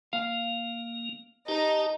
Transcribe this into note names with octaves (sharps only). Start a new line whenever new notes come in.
A#3 F5
D#4 G4 A5